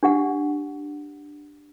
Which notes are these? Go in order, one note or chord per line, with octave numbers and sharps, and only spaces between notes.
D4 G4 F#5